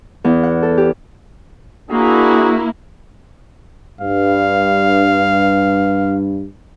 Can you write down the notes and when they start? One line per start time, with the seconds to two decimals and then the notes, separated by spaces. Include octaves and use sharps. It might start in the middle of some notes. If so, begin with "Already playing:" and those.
0.24 E2
0.43 F#5
0.62 A4
0.78 G4
1.91 A#3 D4 E4 F#4 G#4
4.01 G2 F5